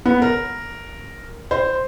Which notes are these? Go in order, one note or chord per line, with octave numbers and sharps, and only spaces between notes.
B3
A#4
C5